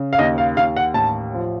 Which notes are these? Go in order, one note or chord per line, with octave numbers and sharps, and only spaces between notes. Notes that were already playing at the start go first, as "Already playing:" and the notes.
Already playing: C#3
F5
D#2 D#5
F5
D#2 F5
F#5
A1 A5
F3